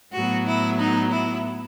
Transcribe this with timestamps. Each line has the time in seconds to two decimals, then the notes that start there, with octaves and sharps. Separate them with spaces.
0.13 A2 F#3 B3 F#4
0.46 E4
0.79 D#4
1.11 E4